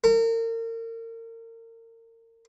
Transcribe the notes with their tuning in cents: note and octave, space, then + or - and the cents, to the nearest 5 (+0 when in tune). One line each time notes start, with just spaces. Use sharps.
A#4 -35